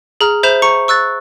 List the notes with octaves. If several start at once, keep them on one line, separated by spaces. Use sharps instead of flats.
G#4 A#5 F6
C5 E5 B5 G6 E7 F7
A#5 C#6 C#7
C#6 E6 F#6 A6